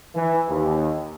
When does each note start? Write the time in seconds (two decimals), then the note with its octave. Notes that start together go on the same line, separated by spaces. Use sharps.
0.15 E3
0.49 D#2